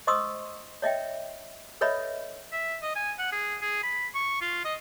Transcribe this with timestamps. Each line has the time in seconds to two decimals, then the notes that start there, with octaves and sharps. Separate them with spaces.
0.07 C5 D#5 C6 C#6 D#6 E6
0.82 C#5 D#5 E5 G5
1.81 A4 B4 C#5 D#5 E5 B5
2.52 E5
2.82 D#5
2.96 G#5
3.18 F#5
3.32 G#4
3.61 G#4
3.83 B5
4.15 C#6
4.41 F4
4.64 D#5